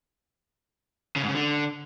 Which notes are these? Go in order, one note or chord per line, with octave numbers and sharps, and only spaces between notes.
C#3
G#2
C#3
D3